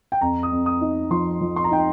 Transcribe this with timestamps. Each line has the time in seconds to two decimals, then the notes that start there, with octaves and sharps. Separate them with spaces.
0.12 G5
0.21 F2 A#5
0.43 D#6
0.52 F2
0.66 D#6
0.81 D#4
1.11 F3 C6
1.41 F3
1.56 C6
1.64 A#5
1.71 D#4 G5